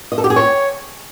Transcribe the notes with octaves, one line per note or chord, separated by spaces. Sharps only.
D#5
A4
G4
G#4
C#5